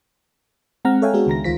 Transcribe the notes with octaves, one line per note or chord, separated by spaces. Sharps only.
G#3 C4 F#5 A#5 F6
A4 C#5 E5 F5 G5 G#5
G#3 B3 D4 F#4 G#4
C#2 D#3 A#5 A#6
D2 D#3 F4 C5 B6